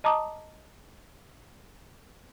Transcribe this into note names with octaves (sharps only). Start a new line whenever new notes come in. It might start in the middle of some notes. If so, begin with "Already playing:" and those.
D#5 A5 A#5 D6 D#6